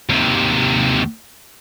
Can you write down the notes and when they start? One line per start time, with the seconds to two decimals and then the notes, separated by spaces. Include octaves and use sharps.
0.10 D#2 C3